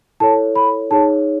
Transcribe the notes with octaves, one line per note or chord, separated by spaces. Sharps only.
E4 A4 C#5 A5
B5
D#4 G#4 C#5 A5